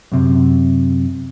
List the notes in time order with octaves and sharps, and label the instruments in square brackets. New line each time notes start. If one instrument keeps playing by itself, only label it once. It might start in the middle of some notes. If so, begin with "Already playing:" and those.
[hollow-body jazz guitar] F#2 C3